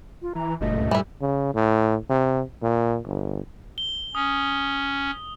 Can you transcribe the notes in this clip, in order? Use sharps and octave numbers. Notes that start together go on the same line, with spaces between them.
F4
E3 A#5
F#1 G2 A#2 A3 D#5
C#2
E3 G3 E4
C#3
A2
C3
A#2
G1
G7
C#4 D#6